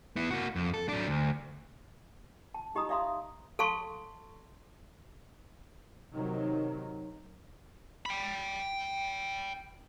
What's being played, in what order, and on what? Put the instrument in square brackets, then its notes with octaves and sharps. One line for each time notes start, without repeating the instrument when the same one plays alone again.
[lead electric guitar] B3 E4
A#3 F#4
F2
A4
F#3 D4
D2
[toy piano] A5
D#4 G4 D#5 A#5 B5 D#6
D5 E5 F5 A#5 C6 D#6
A4 F5 A5 C6 C#6
[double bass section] C3 D#3 F#3
[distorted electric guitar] G5 B5